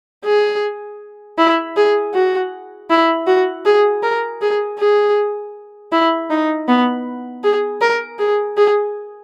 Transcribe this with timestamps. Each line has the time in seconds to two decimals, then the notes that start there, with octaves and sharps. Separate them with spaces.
0.25 G#4
1.38 E4
1.76 G#4
2.14 F#4
2.90 E4
3.27 F#4
3.66 G#4
4.03 A#4
4.41 G#4
4.79 G#4
5.92 E4
6.30 D#4
6.68 B3
7.44 G#4
7.81 A#4
8.19 G#4
8.57 G#4